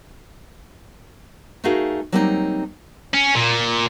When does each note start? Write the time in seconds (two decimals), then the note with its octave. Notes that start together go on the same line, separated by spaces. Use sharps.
1.64 A3 D#4 F#4 G#4 A#4 F5
2.12 F#3 G3 A#3 C4 D4 D#4
3.14 C#4
3.35 A#2